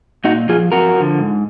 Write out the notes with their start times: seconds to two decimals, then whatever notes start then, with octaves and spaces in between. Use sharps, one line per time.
0.24 A#2 D#4 F#4
0.49 F3 F4 G#4
0.72 F2 F#4 A#4
0.96 D3 F3
1.19 G#2